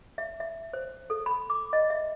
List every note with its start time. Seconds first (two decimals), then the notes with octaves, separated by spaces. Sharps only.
0.18 E5
0.40 E5
0.73 C5
1.10 A4
1.26 B5
1.50 D6
1.73 D#5
1.90 E5